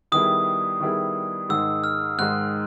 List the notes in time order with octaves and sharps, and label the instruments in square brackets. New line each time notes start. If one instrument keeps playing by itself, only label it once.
[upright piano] D#3 G3 B3 E4 G#4 [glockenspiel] D#6
[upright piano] D#3 G3 B3 E4 G#4
[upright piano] G#2 D#3 G#3 [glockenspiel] E6
[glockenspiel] F6
[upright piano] G#2 D#3 G#3 [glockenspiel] F#6